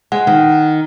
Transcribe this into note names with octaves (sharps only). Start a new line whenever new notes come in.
G#3 F#5
D#3